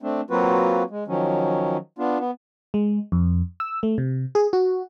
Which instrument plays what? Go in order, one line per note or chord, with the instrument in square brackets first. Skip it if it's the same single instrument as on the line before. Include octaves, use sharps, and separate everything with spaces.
[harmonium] A3 C4 D4
F#3 A#3 C4 F4 F#4 B4
G#3
D#3 F3 F#3 C#4
B3 D4 F4
B3
[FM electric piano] G#3
F2
E6
A3
C3
G#4
F#4